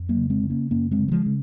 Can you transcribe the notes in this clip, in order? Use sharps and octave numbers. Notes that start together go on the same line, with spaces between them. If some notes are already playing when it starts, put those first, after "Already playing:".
Already playing: F2
F#3 A#3
C#3
G#3 C4
C#3
A#3 C#4
F#2 A#3 C#4
G#3 C4
C#3
F#3
F3 G#3
C#3